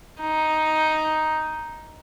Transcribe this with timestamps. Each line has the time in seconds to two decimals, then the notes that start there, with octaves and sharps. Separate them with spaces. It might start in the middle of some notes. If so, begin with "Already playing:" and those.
0.21 D#4